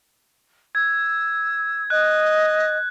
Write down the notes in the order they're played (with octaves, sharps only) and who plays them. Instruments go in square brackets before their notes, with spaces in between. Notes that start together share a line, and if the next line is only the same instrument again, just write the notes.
[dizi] E6 [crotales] G#6
[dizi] D#5 [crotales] F#6